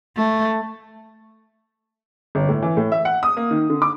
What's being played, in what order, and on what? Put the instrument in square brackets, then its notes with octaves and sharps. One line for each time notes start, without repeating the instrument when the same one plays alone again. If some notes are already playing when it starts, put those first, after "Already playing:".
[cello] A3
[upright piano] G1
A2
E3
A2
E5
F#5
D#6
A#3
D#3
D3
D6